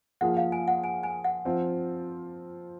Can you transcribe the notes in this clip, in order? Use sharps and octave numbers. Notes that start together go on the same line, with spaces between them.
F3 A#3 F4 G#4 F#5
F5
G#5
F#5
G#5
G#5
F#5
F3 C4 F4